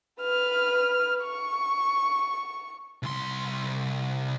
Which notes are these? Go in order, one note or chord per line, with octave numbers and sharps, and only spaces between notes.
B4 F6
C#6
C2 C6